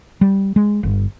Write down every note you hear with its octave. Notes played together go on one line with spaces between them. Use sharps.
G3
G#3
G1